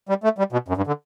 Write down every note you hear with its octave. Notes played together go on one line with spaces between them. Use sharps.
G3
A3
G3
B2
F#2
G2
D3